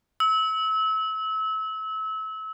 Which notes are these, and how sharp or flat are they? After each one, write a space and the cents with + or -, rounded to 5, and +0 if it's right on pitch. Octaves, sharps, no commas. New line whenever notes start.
E6 -30